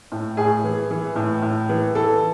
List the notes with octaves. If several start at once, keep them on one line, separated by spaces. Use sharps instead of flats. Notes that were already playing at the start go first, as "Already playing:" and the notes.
A2
A2 G#4
E3
E3
A2
A2
E3
E3 A4